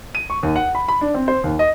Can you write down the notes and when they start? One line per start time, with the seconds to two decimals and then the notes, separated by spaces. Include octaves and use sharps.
0.15 D#7
0.30 C#6
0.43 D#2
0.56 F#5
0.75 B5
0.88 B5
1.01 D4
1.14 C4
1.28 C5
1.44 D#2
1.59 D#5